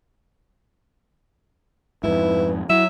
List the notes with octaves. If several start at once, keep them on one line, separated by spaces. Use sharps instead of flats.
F2 G#2 E4 B4
F#3 E4 E5